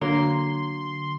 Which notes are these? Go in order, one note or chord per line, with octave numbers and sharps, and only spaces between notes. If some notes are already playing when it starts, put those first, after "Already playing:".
D3 F#3 A#3 D4 A#5 C6